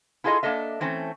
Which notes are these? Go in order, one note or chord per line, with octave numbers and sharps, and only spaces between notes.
E4 F4 G#4 A4 D#5
A#3 D4 A4 D#5 E5
E3 A3 C4 C#4